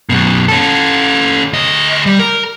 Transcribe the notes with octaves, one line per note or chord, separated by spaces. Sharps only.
F#2 B2
C#4 A4
D2 D#5
G3
A#4